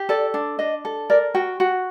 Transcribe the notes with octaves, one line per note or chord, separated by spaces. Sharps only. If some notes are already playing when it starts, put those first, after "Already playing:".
Already playing: G4
A4 D5
D4
D4 D#5
A4
A#4 D5
F#4 G5
F#4